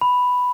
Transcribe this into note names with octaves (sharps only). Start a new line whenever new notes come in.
B5